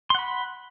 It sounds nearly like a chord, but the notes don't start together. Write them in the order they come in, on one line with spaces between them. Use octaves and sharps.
C6 F#5 B5